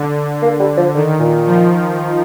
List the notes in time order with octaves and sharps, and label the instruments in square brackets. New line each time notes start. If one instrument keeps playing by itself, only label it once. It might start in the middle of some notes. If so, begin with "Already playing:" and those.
Already playing: [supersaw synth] D3
[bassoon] A#3
G3
F3
[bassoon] D3 [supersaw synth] D#3
[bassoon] A#2
[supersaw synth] F3